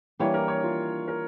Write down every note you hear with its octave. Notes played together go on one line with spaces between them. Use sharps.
E3 G3 A#3 D4 C#5
A#4
C#5
F4
A#4